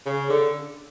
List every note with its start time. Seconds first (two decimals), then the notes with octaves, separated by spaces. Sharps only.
0.06 C#3
0.30 D3